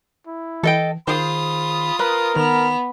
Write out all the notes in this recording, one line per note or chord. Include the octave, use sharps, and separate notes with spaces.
E4
E3 A4 D#5 G5
D#3 F4 G#4 C5 B5 D#6
A#4 B4 B5
D#3 B3 F7